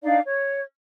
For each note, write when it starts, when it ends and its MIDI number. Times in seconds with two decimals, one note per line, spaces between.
0.03 0.18 62
0.03 0.18 63
0.03 0.18 74
0.03 0.18 77
0.24 0.60 73